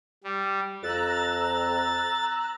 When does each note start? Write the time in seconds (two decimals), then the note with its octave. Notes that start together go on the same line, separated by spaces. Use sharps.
0.24 G3
0.83 F2 A#5 E6 F#6 A6